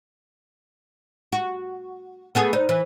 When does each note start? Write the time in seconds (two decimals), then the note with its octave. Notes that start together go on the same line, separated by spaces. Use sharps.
1.32 F#4
2.35 A3 B3 G#4
2.53 D#4 C5 D5
2.69 E3 C5